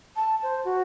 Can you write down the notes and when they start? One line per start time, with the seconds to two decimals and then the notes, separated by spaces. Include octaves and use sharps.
0.16 A5
0.43 C5
0.65 F#4